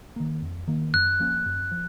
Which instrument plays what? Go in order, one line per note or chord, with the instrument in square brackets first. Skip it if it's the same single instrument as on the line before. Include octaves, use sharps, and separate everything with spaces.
[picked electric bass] D#3 A#3
F2
D#3 A#3
[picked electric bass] F#2 [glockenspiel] F#6
[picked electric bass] F3 A#3 C#4
F#2
F3